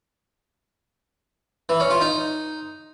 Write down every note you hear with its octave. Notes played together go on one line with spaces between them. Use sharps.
E3
C#4
F4
D#4